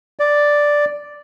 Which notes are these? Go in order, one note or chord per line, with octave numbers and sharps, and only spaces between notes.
D5